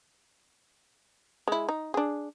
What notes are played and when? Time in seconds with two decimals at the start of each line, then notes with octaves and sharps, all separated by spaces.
1.48 G#3 E4
1.69 D#4
1.94 D4 G#4